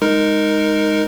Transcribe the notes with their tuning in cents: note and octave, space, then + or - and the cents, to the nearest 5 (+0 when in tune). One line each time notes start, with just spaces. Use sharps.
G#3 -10 D#4 +0 A#4 +0